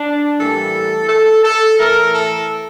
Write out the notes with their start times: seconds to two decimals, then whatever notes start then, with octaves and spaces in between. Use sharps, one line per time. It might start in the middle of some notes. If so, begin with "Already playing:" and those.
Already playing: D4
0.39 A2 E3 G3 A#3 A4
1.09 A4
1.44 A4
1.79 A2 E3 A3 A#4
2.14 A4